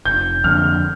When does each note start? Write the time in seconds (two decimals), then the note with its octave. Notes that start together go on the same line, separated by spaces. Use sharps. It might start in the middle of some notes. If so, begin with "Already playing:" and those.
0.05 F1 G6
0.44 F2 D3 F6